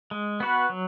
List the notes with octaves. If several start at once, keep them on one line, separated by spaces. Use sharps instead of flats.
G#3
B3 F#4 B4
F#3